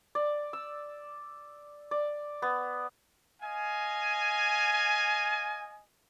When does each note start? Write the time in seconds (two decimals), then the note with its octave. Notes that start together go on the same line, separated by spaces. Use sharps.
0.15 D5
0.53 E6
1.91 D5
2.42 B3
3.42 D#5 F5 G#5